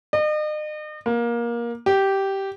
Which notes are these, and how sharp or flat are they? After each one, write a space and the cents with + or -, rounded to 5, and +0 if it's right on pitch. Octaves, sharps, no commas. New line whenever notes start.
D#5 -40
A#3 +20
G4 -10